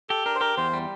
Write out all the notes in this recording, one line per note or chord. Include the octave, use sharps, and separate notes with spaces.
G4 A4
D4 A#4
C5
G4 A#4
E2 C5
G3